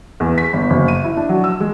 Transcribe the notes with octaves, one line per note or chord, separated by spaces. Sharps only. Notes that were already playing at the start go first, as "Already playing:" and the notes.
E2
B6
G1
F#1
D#7
E4
D4
F#3
E6
G#3